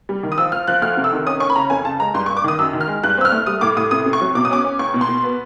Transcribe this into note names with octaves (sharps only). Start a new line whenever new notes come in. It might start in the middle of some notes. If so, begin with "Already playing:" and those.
G3
D#3
D#6
F3 E6
F3 F6
F3 F#6
D2 F6
C3
E6
D#3
C#4 D#6
C#4 C#6
B5
C#3 A#5
F2 G#5
C#3 A5
G#3 A#5
G2 C6
C#6
G2
D6
D#3 D#6
F#2 E6
D#3
F6
G#3
G2 F#6
C4 E6
F6
A3
G3 D#6
A2 D6
A2 D#6
C3 D#6
C3
C#6
F#3
B2 D6
D#6
C#4 D6
C#4
C#2 C#6
B2
C6
B2
B3